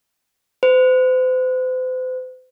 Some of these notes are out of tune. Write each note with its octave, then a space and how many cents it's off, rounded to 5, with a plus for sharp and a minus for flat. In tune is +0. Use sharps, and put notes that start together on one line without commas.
C5 -40